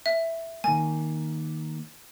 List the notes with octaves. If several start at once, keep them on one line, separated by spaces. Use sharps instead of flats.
E5
D#3 A#3 G#5